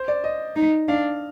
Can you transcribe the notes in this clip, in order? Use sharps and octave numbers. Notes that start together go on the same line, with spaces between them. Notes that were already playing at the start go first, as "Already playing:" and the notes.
Already playing: C5
D5
D#5
D#4
D4 F5